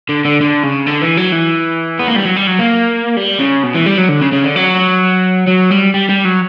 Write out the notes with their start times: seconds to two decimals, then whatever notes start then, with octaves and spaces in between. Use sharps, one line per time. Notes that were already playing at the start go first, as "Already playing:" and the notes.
0.09 D3
0.25 D3
0.41 D3
0.63 C#3
0.86 D3
1.02 E3
1.17 F#3
1.32 E3
1.99 B3
2.08 A#3
2.16 G3
2.25 F#3
2.36 G3
2.48 F#3
2.59 A#3
3.17 G3
3.40 C#3
3.64 B2
3.75 E3
3.86 G3
3.98 F#3
4.09 D3
4.21 C#3
4.32 C#3
4.44 D3
4.56 F#3
5.48 F#3
5.71 G3
5.94 G3
6.09 G3
6.25 F#3